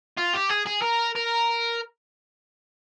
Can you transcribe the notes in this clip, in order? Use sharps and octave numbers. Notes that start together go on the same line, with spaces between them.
F4
G4
G#4
G#4
A#4
A#4